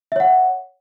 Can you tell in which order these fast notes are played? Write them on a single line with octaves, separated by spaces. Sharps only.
E5 C#5 F#5